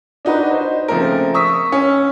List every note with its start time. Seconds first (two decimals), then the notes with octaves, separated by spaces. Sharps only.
0.25 D4 D#4 F#4 B4
0.51 C5
0.88 C#3 F3 A3 A#3 C4 A#4
1.34 C#6 D#6 E6 B6
1.72 C#4